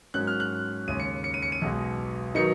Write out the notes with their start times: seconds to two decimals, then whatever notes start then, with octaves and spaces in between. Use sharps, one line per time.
0.14 G#2 F#3 A#3 C#4 F#6
0.27 F6
0.40 F#6
0.88 D#2 C#3 G#3 C#4 D#7
1.00 C#7
1.24 C#7
1.34 D#7
1.42 C#7
1.52 D#7
1.62 B1 B2 G#3
2.35 D#3 F#3 B3 D#4 C#7